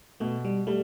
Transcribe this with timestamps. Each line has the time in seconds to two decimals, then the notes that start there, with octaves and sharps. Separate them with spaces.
0.20 B2 A3
0.45 G3
0.67 G3 A3